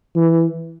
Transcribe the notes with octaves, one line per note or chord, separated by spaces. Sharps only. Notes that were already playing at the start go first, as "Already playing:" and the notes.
E3